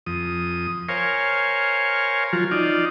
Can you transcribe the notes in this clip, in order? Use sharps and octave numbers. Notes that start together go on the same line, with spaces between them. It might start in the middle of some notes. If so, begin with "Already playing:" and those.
F2 D#6
A#4 C5 C#5 F5 G#5
F3 F#3 F4
D#4 F4 D5